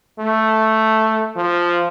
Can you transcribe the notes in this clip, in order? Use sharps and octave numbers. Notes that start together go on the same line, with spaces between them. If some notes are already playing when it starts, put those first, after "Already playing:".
A3
F3